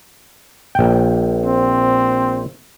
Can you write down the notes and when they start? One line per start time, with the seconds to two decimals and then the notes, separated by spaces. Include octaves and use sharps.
0.75 A#1 G5
1.46 C4